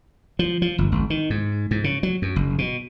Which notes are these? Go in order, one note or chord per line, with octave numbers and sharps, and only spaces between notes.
F3
F3
G1
G#1
D#3
G#2
G#2
C#3
F#3
F#2
F#1
B2